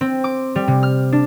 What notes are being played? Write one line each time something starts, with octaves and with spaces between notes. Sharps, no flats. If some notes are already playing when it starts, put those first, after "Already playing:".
C4
D6
G3
C3
F6
D4